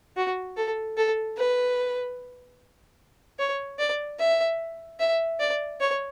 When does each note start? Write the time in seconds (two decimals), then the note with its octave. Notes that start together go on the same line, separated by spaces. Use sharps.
0.17 F#4
0.57 A4
0.97 A4
1.37 B4
3.39 C#5
3.79 D5
4.19 E5
4.99 E5
5.40 D5
5.80 C#5